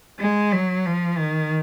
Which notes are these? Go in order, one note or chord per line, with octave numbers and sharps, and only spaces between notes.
G#3
F#3
F3
D#3